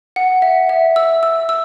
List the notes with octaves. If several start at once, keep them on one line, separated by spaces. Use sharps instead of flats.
F#5
E5
E5
E6
E6
E6